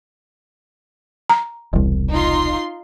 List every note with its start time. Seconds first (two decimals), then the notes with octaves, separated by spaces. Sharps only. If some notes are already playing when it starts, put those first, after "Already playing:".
1.30 A#5
1.73 E1 C2
2.10 D#4 F4 C6